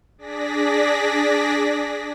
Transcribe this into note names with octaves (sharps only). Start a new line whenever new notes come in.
D4 G#4 D5 A#6 B6